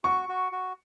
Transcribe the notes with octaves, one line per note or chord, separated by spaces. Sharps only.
F#4 C#6
F#4
F#4